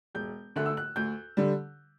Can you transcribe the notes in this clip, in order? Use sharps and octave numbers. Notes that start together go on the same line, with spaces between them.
E1 G6
D2 D3 A3 F#6
E6
F#6
D2 G6
D3 G3